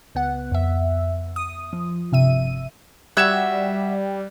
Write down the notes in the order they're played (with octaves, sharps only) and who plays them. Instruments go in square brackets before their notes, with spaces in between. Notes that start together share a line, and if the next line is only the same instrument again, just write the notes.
[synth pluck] C#2 B3 F#5
F2 E5
D#6
F3
G1 C3 E5 D#7
[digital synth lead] G3 [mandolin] F#4 E5 [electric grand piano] F#6 G#6 E7